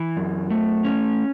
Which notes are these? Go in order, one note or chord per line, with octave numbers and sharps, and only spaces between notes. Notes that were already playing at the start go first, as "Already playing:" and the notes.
Already playing: E3
F#2
A3
C#4